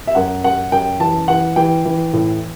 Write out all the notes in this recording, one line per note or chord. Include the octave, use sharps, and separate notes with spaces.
E5
F#2 F#5
F#2 F#5
F#2 G5
E3 A5
E3 F#5
E3 G5
E3
A2